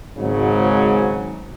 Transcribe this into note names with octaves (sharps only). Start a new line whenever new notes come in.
G#1 G#2 C#3 F#3